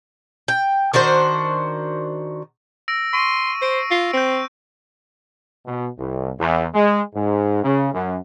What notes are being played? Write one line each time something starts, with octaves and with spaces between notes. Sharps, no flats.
G5
D#3 D4 F#4 C5
E6 A#6 D7
C6 C#6 D7 D#7
C5 C7 D7
F4
C4 G6 D7
B2
C2
E2
G#3
G#2
C#3
F#2